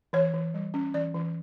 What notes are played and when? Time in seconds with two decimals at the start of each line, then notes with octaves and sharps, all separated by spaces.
0.13 E3 C#5
0.34 E3
0.54 G3
0.74 C#4
0.94 E3 D5
1.14 E3